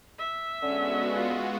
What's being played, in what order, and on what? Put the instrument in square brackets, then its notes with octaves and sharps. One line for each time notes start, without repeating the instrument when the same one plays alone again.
[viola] E5
[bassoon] D3 [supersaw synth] G#3 B3 F#4 [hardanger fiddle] C#4
[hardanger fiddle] F4